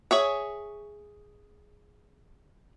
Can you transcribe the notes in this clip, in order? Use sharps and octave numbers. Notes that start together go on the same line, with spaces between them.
G#4 C#5 E5